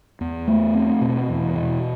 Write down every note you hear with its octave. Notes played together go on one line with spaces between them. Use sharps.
E2
A3
C4
B2
E2
B2